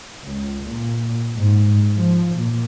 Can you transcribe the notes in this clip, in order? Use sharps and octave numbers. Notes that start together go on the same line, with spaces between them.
C#2
A#2
G#2
F3
A#2